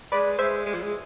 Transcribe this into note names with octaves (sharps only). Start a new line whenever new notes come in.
G#3 B4 D5
G#3 C5 E5
G#3
F3
G#3